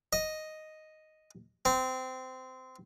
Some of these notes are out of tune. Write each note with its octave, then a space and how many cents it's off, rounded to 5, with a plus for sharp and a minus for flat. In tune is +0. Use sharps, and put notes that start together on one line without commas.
D#5 +0
C4 -20